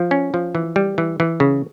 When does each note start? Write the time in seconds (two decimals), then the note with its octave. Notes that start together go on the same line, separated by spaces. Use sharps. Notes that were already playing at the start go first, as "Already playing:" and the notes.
Already playing: F3
0.11 C#4
0.34 F3
0.55 E3
0.76 G3
0.98 E3
1.20 E3
1.40 C#3